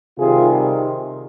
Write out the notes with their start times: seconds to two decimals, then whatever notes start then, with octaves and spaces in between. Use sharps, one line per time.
0.19 C3 D#3 G3 F4 G#4